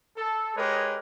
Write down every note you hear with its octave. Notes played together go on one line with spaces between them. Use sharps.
A4
G#3 G4 A#4 B4 C#5 D#5